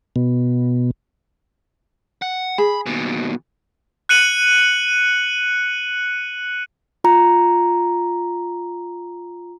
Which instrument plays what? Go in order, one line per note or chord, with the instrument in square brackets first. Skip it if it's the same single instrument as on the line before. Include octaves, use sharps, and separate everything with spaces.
[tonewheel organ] B2
[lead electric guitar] F#5
[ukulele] G#4 [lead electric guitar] B5
[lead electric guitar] D#2 B2
[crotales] F#6 C#7 D#7 F#7
[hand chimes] F4 A#5